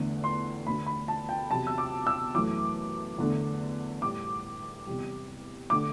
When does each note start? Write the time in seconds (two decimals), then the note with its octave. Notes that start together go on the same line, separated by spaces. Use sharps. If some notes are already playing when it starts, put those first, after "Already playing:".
Already playing: E2 D3 A3
0.24 C6
0.66 D2 D3 A3 B5
0.86 B5
1.08 A5
1.29 G5
1.51 E2 C3 F#3 A5
1.67 E6
1.78 D6
2.07 E6
2.35 F#2 E3 A3 D6
3.18 E2 D3 A3
4.02 A2 G3 D6
4.87 E2 C3 G3
5.70 D3 A3 D6